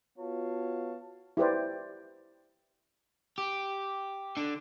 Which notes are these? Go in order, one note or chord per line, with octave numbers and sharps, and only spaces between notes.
B3 F4 F#4 C#5 F5 A5
E4 G4 B4 C5 D5
G4
D3